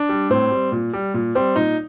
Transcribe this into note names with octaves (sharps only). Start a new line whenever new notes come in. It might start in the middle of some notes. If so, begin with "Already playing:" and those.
Already playing: D4
G3
A2 C4
G3
A#2
G3
A#2
G3 C4
A#2 D#4